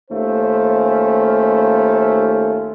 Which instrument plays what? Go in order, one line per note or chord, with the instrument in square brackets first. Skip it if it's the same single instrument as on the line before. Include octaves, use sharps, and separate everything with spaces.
[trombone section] D#2 A3 C#4 F4 C5